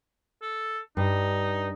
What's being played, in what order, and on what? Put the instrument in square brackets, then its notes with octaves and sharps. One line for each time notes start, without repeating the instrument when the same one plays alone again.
[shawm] A4
[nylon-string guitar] G2 [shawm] D#4